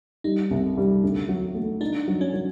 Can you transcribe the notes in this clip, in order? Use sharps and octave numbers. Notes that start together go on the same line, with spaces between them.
G3 D#4
C2
G3
D2
F#3
A3
D4 D#4
F#3
C#4
F#3